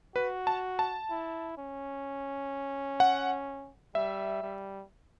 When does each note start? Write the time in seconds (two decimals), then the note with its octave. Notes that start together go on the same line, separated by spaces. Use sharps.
0.15 F#4 B4
0.47 A5
0.79 A5
1.10 E4
1.58 C#4
3.00 F#5
3.95 G3 E5
4.42 G3